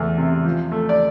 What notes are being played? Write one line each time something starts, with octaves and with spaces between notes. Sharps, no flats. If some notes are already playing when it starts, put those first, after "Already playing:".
Already playing: E2 A3
C3
F3
A3
D5